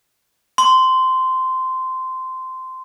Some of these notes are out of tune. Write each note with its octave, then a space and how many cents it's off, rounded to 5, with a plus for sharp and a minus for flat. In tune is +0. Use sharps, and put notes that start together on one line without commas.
C6 -15